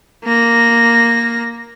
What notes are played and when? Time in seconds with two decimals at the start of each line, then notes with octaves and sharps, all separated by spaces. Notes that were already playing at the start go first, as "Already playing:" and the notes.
0.24 A#3 A#6